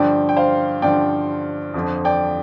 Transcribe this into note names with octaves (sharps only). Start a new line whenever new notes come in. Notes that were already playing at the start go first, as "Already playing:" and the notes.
Already playing: G2 D3 F3 D5 G5
G5
C5 F5
G2 D3 F3 D5 G5
F2 D3 F3
D5 G5